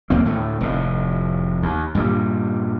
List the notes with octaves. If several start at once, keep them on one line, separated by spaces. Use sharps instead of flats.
D#2 A#3 C4
D2 A2 A3
F1 A2
D#2
G2 A#2 F#3 G3